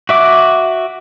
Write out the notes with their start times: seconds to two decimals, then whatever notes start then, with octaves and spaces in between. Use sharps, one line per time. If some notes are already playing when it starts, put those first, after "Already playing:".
0.09 F#4 E5 D6